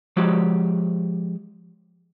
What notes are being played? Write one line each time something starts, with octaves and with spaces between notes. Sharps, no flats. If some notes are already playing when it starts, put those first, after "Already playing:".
F3 G#3 F#4 G4